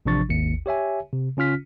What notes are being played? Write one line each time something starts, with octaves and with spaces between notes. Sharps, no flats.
A1 C3 F3 D4 C#6 A6
G#1 D#2 C#7
G4 C#5 E5 G#5
C3
C#3 C#4 F4 F6 B6